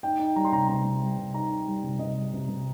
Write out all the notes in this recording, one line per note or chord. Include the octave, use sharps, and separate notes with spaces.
D#4 G5
D#4
G3 A#5
C6
C3 A#5
C3 A#5
C3
G3
C3
D#4 A#5
D#4
G3
C3
C3 D#5
G3
C3
C3